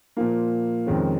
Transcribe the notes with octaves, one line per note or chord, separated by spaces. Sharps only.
A#2 F3 A#3
F2 C3 D#3 G#3 C#4